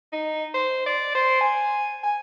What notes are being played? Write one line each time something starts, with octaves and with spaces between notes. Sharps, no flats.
D#4
C5
D5
C5
G#5
G#5